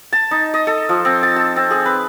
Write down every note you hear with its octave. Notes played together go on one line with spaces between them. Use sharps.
A5
D#4
D#5
A4
F3
C4
A5
A5
C4
G#4
B4